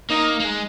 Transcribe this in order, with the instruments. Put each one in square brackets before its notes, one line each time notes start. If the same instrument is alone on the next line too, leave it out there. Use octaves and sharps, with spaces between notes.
[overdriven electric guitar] A#3 [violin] D#4
[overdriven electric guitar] A#3
G#3